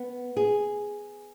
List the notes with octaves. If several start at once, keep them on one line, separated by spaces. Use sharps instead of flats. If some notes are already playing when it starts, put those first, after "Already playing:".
Already playing: B3
G#4